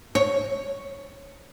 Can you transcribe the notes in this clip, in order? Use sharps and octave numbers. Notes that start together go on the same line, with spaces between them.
C#5